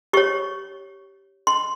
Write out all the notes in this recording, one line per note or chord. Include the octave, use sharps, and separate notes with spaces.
G4 C#5 C#6
C6